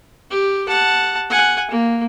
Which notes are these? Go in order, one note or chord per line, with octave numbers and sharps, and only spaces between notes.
G4
F#5 A5
F#5 G#5
A#3